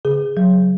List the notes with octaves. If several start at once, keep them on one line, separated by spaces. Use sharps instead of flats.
C#3 G#4
F#3